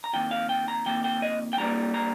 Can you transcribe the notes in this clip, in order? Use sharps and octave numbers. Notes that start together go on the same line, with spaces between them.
A#5
F2 D#3 A#3 G5
F5
G5
A#5
F2 D#3 A#3 G5
G5
D#5
G5
G2 G3 A#3 A#5
A#5